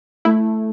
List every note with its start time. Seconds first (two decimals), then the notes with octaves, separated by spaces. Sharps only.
0.25 A3 E4